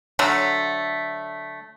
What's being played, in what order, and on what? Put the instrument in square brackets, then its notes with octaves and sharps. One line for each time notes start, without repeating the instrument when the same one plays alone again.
[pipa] D3 F#3 A3